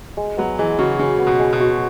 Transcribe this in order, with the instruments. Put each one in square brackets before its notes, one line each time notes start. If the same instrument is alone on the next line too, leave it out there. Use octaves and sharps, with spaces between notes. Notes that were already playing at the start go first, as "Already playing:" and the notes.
[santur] G#3
[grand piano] F#3 [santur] B3
[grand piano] E3 [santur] G#3
[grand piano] C#3 [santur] F#4
[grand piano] C#3 [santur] G#3
[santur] B3
[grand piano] B2
[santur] G#3
[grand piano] B2
[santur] F#4